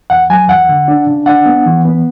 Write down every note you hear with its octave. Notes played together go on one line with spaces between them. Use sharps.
E2 F#5
F#3 G#5
E2 F#5
D3
D4
C#3
D4 F#5
B3
E3
B3